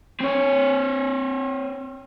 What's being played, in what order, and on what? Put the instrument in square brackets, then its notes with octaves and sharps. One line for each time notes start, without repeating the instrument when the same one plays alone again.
[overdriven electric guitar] C4 C#5